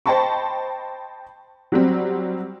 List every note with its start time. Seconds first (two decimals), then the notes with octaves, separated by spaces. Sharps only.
0.06 C5 D#5 G5 A5 B5 C#6
1.72 F#3 G3 C4